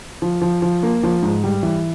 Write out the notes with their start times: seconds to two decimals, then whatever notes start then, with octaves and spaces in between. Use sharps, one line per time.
0.22 F3
0.41 F3
0.62 F3
0.83 A#3
1.03 F3
1.22 G#2
1.44 G3
1.63 E3